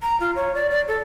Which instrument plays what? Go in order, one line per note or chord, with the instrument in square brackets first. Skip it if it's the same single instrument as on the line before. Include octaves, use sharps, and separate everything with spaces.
[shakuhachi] A#5
F4
C#5
D5
D5
A4